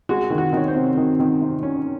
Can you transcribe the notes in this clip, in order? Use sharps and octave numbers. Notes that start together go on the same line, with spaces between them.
G#3 F#4
D#3
F#4
D#3 C#5
C5
C3
D#3
D#3
C3
C#4